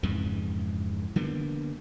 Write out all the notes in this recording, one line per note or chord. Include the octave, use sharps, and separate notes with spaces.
F2 G#2 C#3 E3
D3 G3 A#3 B3